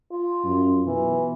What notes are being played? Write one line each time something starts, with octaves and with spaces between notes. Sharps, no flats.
F4
F#2
B2 E3